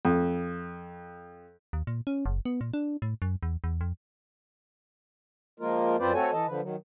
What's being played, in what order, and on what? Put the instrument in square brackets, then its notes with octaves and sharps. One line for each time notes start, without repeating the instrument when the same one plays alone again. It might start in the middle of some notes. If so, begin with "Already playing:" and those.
[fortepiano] F2
[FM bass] D#2
A#2
C#4
F#1
B3
A#2
D4
A2
F#2
E2
E2
F2
[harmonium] F3 G#3 A#3 F4 A#4
F#2 C4 F4 B4 C5 D5
A3 C4 F#4 A4 C#5 G#5
E3 A4 D#5 A5
D3 F3 B4
D#3 F#3